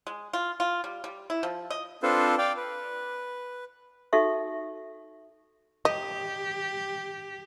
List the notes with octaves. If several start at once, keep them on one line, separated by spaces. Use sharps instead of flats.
G#3
F4
F4
G3
G3
E4
F3
D#5
C4 D4 F4 A4 B4 C5
D5 F5 G5
B4
D#4 F#4 A4 E5 C#6
G4 D#5